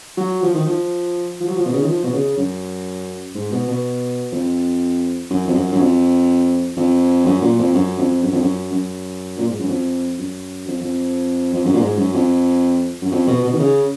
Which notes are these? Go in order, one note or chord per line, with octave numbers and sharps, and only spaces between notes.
F#3
F3
D#3
F3
F3
F#3
F3
B2
C#3
D#3
F3
B2
C#3
F#2
G#2
B2
B2
F2
F#2
F2
F#2
F#2
F2
F2
F#2
A#2
F2
F#2
F2
F#2
F2
F#2
F#2
A#2
G#2
F#2
F2
F#2
F2
F2
F2
F#2
A#2
G#2
F#2
F2
F#2
F2
B2
B2
D#3
C#3